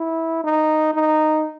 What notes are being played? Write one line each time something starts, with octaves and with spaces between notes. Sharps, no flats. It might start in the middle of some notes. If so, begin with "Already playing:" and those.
Already playing: E4
D#4
D#4